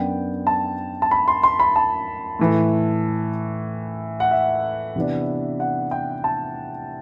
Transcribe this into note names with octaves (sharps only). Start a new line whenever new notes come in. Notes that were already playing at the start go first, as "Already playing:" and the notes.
Already playing: F#2 F#3 B3 D4 G5
A5
A5
B5
C6
C6
B5
A5
A2 E3 A3
F#5
E5
C3 E3 B3 D4
F#5
G5
A5